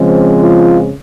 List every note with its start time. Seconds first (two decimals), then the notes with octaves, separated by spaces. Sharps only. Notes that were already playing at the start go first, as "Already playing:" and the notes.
Already playing: C#3 F3 G#3 C4
0.40 F4